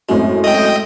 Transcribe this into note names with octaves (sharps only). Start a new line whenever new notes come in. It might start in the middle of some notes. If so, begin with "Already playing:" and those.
F#2 A2 G#3 C4
G#3 A3 D#5 G5